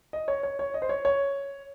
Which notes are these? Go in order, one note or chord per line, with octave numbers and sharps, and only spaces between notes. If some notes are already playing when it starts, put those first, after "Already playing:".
D#5
C#5
C#5
C#5
D#5
C5
C#5
C#5